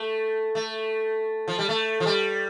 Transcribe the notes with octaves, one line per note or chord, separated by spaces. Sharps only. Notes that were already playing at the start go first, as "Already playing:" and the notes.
Already playing: A3
A3
F3
G3
A3
F3
G3